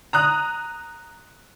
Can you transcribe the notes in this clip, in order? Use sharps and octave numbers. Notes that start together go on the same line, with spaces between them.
A#5 D#6 F#6